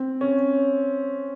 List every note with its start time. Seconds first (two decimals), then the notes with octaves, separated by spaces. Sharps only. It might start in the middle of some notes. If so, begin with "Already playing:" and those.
Already playing: C4
0.21 C#4